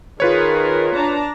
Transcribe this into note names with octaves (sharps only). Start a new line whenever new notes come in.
D#3 F4 G#4 A#4 B4 C#5
D4 A5 A#5